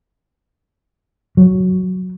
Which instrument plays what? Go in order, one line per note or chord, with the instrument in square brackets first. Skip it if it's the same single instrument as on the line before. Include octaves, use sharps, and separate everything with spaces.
[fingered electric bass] F#3